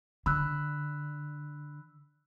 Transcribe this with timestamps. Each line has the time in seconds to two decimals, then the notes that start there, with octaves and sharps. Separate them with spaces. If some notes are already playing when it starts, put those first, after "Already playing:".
0.26 D3 B5 E6 F#6